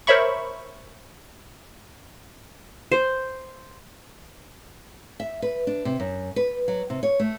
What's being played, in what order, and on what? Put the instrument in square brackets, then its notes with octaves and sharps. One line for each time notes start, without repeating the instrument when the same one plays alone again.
[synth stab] A#4 C5 C#5 E5 B5 C#6
[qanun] C5
[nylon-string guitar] E5
B4
D4
C3
F#2
B4
F#3
C3
C#5
A3